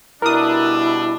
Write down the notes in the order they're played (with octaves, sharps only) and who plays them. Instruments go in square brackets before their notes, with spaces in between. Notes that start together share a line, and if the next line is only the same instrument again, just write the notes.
[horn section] B2 G3 D4 [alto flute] E4 [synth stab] A#4 D#6